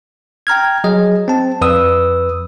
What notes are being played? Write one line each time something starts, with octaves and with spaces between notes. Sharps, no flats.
G5 A#5 F6 G#6
F#3 G#4 D#5
C4 A5
F2 B4 D#6 E6